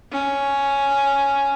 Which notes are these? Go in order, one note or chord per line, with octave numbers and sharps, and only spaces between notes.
C#4